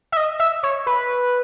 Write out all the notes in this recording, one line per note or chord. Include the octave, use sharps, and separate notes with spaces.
E5
D#5
E5
C#5
B4